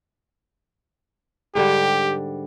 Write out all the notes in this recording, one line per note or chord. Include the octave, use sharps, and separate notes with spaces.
G#2 D3 G3 G4